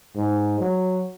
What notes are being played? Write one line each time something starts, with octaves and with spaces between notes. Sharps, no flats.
G#2
F#3